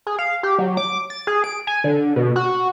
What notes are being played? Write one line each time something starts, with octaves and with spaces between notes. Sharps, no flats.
G#4
F5
G4
F#3
D6
A6
G#4
D7
G#5
D3
B2
F#4